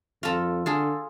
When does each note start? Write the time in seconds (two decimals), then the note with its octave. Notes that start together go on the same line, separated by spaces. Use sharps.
0.23 F2 F4 A4 A#5
0.66 D3 F4 G#4 A4